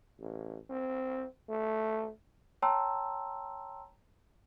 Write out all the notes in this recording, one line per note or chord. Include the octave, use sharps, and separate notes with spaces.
A1
C4
A3
C#5 G5 A5 A#5 C6 E6